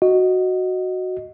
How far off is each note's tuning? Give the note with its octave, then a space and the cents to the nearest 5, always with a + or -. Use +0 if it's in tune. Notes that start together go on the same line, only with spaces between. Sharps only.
F#4 +0 D#5 +0